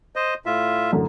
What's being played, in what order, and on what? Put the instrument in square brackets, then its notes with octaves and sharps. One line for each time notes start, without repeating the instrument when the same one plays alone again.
[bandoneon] C5 D#5
A2 F4 E5
[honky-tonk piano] F#2 A2 D3